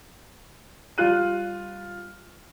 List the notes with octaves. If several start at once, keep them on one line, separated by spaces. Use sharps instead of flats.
G3 F4 F#6 D#7